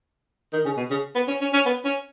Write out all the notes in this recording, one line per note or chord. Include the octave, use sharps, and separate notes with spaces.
D#3
C#3
B2
C#3
B3
C#4
C#4
C#4
B3
C#4